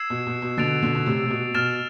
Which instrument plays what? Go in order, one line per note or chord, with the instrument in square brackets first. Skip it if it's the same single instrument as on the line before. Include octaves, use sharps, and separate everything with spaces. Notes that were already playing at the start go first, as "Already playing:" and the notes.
Already playing: [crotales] E6 G#6 C7 E7
[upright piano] B2
B2
B2
[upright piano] B2 D3 [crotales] A6 D7 F7
[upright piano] B2 D3
B2
A2 C3
C3
B2
[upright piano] B2 [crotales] F6 A6 E7